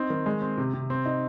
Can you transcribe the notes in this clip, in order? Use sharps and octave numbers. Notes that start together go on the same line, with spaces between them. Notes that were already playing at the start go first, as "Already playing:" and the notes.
Already playing: C4 D#4
D#3
G#3
C4
C3
C3
C4
D#4